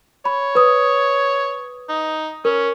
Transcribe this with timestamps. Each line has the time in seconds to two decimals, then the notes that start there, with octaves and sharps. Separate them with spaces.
0.25 C#5 B5
0.55 B4 D#6
1.89 D#4
2.45 C#4 A#4